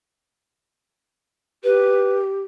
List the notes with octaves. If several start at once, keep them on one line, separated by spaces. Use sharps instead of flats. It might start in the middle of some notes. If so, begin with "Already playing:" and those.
G4 B4